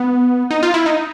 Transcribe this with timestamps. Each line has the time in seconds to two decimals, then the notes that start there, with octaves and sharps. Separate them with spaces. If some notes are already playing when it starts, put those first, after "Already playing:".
Already playing: B3
0.51 D#4
0.63 F4
0.74 E4
0.86 D#4